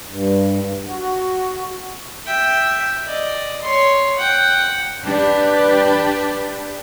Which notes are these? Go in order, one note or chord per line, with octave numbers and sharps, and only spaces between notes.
G2
F#4
E5 G5
D5 D#5
C#5 C6
F#5 G5
D4 G4 B4